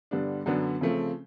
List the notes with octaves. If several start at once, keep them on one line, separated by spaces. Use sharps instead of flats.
G2 D3 G3 B3 D4
F#2 D3 F#3 B3 D4
C#3 F3 A3 C4